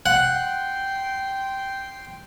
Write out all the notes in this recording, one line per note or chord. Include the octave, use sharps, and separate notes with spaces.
F#5 G5 C6